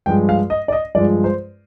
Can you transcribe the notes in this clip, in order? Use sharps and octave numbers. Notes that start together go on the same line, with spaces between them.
G2 F3 G#3 G5
F5
D#5
D5
D#5
G2 F3 G#3 D5
C5